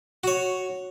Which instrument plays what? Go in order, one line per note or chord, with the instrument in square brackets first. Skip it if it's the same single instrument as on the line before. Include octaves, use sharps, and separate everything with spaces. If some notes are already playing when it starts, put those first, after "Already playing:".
[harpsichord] F#4 C#5